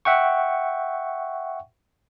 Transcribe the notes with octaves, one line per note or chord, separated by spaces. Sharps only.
E5 F#5 G5 C#6